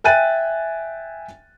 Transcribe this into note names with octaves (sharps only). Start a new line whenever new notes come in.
E5 G5 G#5 F#6 A6 D#7